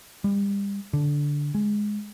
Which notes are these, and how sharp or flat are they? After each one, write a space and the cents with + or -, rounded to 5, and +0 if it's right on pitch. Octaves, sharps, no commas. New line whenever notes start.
G3 +35
D3 -10
G#3 +5